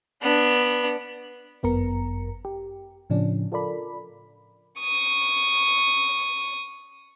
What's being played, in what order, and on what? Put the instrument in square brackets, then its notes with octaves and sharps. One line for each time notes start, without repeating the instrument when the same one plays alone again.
[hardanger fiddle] B3 D4
[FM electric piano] G1 F#2 B3 A#4 A#5 C#7
G4
A2 C#3 F3 C#4 D4
F4 A4 A#4 D5 B5
[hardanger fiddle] C#6 D#6